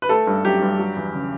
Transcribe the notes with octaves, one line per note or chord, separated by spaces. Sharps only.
B4
A3 A4
G2
F#3 G4
G2
F#3
E2
C#3